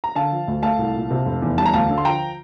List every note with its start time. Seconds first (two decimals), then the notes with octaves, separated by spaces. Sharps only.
0.04 A#5
0.15 D3 F5 A5
0.32 F3
0.48 D2
0.63 A3 F5 A5
0.79 C2
0.95 A#2
1.11 C3
1.26 F1
1.42 E2
1.58 G3 A5
1.66 A#5
1.74 D2 F5 A5
1.89 D3
1.98 C6
2.05 F3 G5 A#5